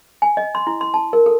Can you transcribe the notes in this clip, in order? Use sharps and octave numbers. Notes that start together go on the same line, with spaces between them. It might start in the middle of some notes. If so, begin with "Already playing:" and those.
G#5
D#5
C6
E4
C6
A5
A#4
A4